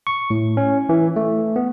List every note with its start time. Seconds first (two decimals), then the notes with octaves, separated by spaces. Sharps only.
0.07 C#6
0.30 A2
0.57 C#4
0.89 E3
1.16 A3
1.56 B3